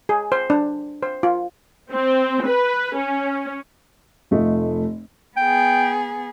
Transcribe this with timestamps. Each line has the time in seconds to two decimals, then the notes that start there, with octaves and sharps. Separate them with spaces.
0.09 G#4
0.32 C5
0.50 D4
1.03 C5
1.23 F4
1.92 C4
2.46 B4
2.96 C#4
4.31 F1 A3 F4 D#5
5.37 B3 G#4 G5